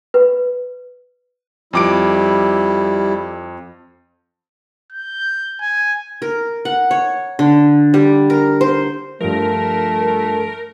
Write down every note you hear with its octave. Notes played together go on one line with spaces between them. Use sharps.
B4
F2 G3 E4 D6 D7
G6
G#5
A#4
F#5
C#5
D3
G3
A#4
C5
G2 F3 A3 A#4